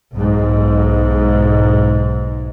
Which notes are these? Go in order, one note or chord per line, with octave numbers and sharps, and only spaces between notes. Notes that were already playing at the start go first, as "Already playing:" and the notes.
B1 G#2